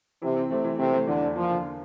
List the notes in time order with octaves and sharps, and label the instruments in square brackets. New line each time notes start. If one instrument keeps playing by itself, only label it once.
[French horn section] C3 [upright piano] E3
[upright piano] C4
[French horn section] C3 [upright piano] A3
[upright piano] E3
[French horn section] C3 [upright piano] A3
[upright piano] A3
[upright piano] E2 [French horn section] D3
[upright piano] E2
[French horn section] F3 [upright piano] A#3
[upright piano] D3
A#3